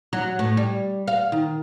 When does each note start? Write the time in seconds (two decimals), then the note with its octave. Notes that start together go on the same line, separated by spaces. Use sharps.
0.13 F#3
0.39 A2
0.57 G3
1.08 F5
1.32 D#3